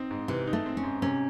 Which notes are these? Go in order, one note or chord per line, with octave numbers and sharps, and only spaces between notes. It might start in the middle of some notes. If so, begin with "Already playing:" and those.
Already playing: C4 D#4
G#2
C3 E3
D#4
A3
C4
C#4
G#2
C3 C#4